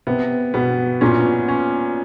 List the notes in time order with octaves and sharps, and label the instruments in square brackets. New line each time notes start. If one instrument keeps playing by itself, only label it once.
[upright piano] C3 [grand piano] B3
[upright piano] B2 [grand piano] B3
[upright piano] A#2 [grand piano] C#4
[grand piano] C#4